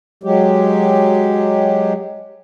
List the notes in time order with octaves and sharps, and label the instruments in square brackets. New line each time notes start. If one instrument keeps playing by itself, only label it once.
[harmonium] F#3 G#3 G4